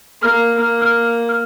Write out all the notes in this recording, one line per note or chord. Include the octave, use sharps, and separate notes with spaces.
A#3 F6
A#3 F6
F6
F6